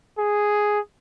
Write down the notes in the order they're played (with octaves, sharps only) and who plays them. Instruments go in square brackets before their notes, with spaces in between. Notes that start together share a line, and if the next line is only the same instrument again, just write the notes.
[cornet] G#4